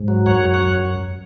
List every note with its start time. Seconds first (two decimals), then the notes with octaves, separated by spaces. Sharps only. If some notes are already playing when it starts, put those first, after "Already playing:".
Already playing: G#2
0.08 F#3
0.26 F#2 C#5 F#5
0.45 F#3
0.54 C#5 F#5
0.63 F#2